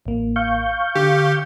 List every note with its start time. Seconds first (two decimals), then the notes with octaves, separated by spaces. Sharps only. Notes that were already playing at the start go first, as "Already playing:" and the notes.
0.06 A1 A#3
0.36 F5 C#6 G6
0.96 D3 G4